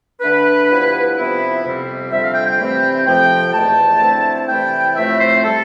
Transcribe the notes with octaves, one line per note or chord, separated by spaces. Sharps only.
D3 A3 D4 B4
G2 F3 B3 E4
C3 F3 B3 E4
F2 C3 G3 C4
F2 D3 G3 C4 E5
F5
G5
G5
C3 E3 A3 C4 E4
F2 C3 F3 G5
E2 B2 A3 A5
D3 A3 C4 E4
C3 E3 A3 E4 G5
A2 F3 A3 C4 E4 E5
C5
C3 G3 A4